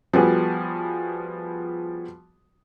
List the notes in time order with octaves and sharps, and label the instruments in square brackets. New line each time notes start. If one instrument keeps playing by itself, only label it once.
[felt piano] F3 G3 B3 F#4 G#4